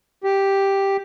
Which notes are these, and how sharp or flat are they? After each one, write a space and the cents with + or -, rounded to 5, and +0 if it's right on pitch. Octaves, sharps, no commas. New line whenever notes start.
G4 +0